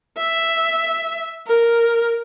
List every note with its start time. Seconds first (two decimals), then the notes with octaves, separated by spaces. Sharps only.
0.17 E5
1.46 A#4